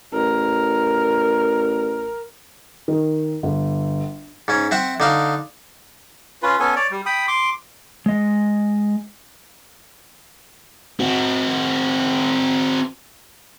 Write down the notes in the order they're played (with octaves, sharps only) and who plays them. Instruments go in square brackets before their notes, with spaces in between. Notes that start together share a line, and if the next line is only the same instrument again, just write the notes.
[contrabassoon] A1 [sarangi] A#4
[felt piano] D#3
G1
[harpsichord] G#2 C#4
C4 E5 F#5 C#6
D3 D#4 F5
[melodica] C#4 F4 B4
B3 C#4 A4 G#5
C#5 D5
G3
G5 B5 D#6
C6 D6
[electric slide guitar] G#3 D#5
[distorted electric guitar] C4 F#4